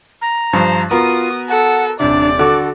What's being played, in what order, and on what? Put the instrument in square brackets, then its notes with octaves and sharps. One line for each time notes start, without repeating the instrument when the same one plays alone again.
[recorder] A#5
[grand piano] G2 F3 [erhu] C5
[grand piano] B3 F#4 A#4 [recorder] F4 [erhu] D#6
[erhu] A4 [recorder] F#5
[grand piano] D#1 C3 [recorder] D4 [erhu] D5
[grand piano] D3 F#4 D6 [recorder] A4